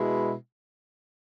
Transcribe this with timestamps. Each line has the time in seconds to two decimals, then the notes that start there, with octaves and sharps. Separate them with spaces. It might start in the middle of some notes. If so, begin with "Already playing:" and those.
Already playing: B2 G#3 E4